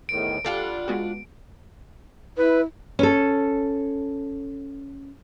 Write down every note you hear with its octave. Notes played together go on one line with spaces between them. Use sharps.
E2 A2 D#3 D7
G3 D4 F4 A4 F#5
G#3 B3 F#4
E4 B4
C#4 A4